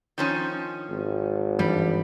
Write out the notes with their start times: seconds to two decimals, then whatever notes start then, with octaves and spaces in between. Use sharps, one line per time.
0.18 D#3 F3 C#4
0.90 G#1
1.59 G2 E3 G3